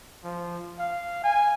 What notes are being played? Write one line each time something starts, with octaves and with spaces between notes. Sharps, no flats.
F3
F5
G#5